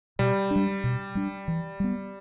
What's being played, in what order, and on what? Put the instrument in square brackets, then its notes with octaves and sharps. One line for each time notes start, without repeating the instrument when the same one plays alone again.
[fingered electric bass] B2 [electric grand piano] G3
[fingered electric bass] G3 D4
B2
G3 D4
E3
G3 B3